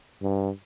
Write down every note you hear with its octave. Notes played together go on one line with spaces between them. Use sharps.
G2